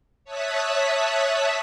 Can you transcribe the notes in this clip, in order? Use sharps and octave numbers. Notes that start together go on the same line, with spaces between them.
C#5 E5 A5 D#6 F#6 B6